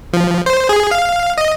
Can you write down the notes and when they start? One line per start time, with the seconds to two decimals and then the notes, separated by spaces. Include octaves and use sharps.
0.13 F3
0.46 C5
0.69 G#4
0.91 F5
1.38 D#5